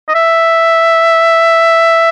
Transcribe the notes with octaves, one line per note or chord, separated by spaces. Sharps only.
D#5
E5